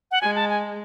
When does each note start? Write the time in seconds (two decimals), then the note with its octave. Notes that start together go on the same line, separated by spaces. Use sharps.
0.11 F#5
0.22 G#3 G#5
0.35 A5
0.49 G#5